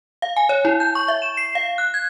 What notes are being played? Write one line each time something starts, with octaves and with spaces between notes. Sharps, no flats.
F5
G#5
C#5
E4
G6
C#6
E5
E7
C7
F5
F#6
G#6